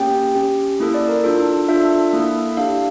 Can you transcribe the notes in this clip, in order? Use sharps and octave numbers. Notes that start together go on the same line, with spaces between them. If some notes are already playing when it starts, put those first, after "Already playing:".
Already playing: A#3 C#4 G4 G5
C#4 G4
A#3 E4 A4
D5
A#4
D4 F4 A4
D4 F4 A4 E5
A#3 E4 A4
D4 G4 F5